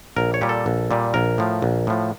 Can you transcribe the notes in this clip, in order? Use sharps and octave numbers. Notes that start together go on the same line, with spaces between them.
A#1 A#4
C#5
A#2 G3 G4
A4
A#1
A#2 G3
A#1 A#4
A2 F3
A#1
A2 F3